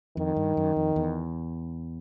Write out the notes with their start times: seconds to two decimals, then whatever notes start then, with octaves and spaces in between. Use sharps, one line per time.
0.17 F2 D#3
0.36 G2
0.57 F#2
0.76 F2
0.96 E2